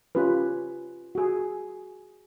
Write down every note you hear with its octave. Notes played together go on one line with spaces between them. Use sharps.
C#4 F4 G4 B4
F#4 G#4